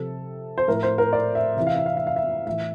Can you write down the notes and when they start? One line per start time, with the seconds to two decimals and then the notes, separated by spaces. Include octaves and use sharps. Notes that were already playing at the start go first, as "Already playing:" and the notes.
Already playing: C3 F3 A4
0.58 C5
0.68 A2 F3 A#4
0.83 C5
0.98 A#4
1.13 D5
1.35 E5
1.57 C3 E3 E5
1.67 F5
1.76 E5
1.86 F5
1.97 E5
2.07 F5
2.16 E5
2.47 A2 E3 E5